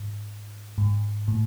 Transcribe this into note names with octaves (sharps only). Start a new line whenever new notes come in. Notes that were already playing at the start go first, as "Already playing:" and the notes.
Already playing: G#2
G#2
A2